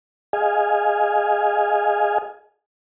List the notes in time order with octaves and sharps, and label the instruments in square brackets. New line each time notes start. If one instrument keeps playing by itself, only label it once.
[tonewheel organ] G#4 D#5 F5 G#5